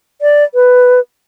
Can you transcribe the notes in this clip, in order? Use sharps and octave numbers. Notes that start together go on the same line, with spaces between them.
D5
B4